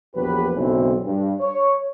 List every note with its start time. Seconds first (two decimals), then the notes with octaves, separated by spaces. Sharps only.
0.15 A#1 E2 F#3 G4 B4
0.54 F#1 B1 D3 E3 C4 G#4
1.06 G2
1.41 C#5